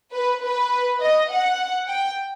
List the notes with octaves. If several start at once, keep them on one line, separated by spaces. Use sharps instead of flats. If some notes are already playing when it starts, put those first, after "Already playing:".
B4
B4
D#5
F#5
G5